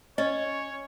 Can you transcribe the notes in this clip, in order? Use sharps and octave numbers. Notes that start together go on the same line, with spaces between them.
C#4 C#5 D#5